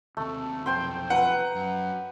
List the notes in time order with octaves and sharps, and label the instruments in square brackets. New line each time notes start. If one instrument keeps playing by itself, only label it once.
[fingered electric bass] D#2 C3 [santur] A3
[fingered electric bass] B1 F2 C3 [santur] C5 G5 C6
[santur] B4 A#5 [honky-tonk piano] F#5
[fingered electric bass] F#2